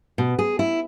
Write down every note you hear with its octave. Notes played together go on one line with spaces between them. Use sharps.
B2
G#4
E4